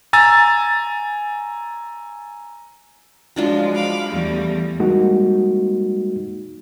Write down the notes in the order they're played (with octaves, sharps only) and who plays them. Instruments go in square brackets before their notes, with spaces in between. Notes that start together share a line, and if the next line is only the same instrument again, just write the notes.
[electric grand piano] G#5 A#5 E6 A6
[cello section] F3 G#3 [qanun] F#3 D4 F4
[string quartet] F5 B5 D6
[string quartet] E2 G3 [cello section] A3
[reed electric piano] G3 G#3 A#3 D#4 F#4